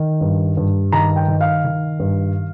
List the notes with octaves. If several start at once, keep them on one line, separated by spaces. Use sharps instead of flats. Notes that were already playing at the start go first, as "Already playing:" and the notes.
Already playing: D#3
G2
G2
D#3 A#5
G5
D#3
F5
D#3
G2